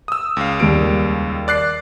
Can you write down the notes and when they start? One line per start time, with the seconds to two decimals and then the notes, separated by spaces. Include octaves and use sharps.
0.08 D#6 E6
0.37 C#2 F5
0.60 D#2 G3 D7
1.48 D5 F#6 C7